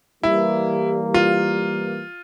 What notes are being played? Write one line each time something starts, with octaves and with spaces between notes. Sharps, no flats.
E3 G3 A#3 E4
F4